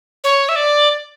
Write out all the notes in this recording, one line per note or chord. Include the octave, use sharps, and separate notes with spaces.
C#5
E5
D5